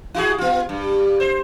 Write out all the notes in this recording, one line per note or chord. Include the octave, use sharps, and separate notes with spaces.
E4 F#4 G#4
B3 F4
G2
C5